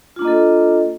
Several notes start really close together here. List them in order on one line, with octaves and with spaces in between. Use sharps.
F4 D4 A#3 D#5 A4